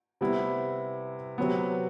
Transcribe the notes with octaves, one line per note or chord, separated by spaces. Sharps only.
C3 G3 B3 E4
C3 F#3 B3